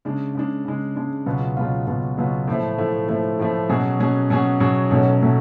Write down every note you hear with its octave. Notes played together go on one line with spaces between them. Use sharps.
C#3 G#3 D4
C#3 G#3 D4
C#3 G#3 D4
C#3 G#3 D4
C#2 B2 F#3 B3 F4
C#2 B2 F#3 B3 F4
C#2 B2 F#3 B3 F4
C#2 B2 F#3 B3 F4
A2 F3 A3
A2 F3 A3
A2 F3 A3
A2 F3 A3
B2 F#3 C#4 G#4
B2 F#3 C#4 G#4
B2 F#3 C#4 G#4
B2 F#3 C#4 G#4
B1 B2 F#3 A3 C#4
B2 F#3 A3 C#4